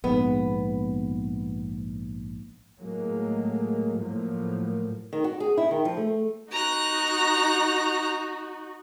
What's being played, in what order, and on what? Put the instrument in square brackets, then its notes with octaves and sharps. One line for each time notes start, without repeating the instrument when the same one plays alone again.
[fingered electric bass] A#1 G#2 [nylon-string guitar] B3
[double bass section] A2 F#3 G#3 A#3
A2 F3 F#3 A#3
[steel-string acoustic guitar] D#3
F#4
G#4
E4
D#3
F3
A3
[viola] D#4 F#4 [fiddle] A#5 F#6